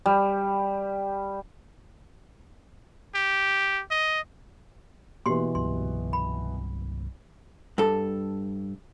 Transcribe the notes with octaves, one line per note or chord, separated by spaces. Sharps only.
G3
G4
D#5
B2 E3 A#3 F#4 G4 C6
C2 G2 F#3 C6
B5
G2 A4